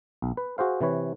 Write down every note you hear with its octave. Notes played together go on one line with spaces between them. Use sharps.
B1
B4
F#4 G#4 C5 F5
C3 E3 B4 C#5